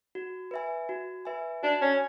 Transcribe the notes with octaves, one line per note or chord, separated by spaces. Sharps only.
F#4
B4 E5 G#5
F#4
B4 E5 G#5
D4 F#4
C#4